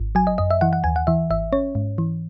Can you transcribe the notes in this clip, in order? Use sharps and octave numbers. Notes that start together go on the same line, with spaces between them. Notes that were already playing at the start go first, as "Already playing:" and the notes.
Already playing: G#1
F#3 G#5
D#5
F#2 D#5
E5
E3 F#5
F#5
D#2 G#5
F#5
E3 E5
G#1 E5
C#4 C#5
G#2
E3